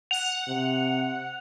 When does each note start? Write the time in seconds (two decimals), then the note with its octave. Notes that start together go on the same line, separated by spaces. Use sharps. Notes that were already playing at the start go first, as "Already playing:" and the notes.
0.11 F#5 F7
0.48 C3